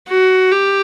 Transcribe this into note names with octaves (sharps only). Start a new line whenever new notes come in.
F#4
G4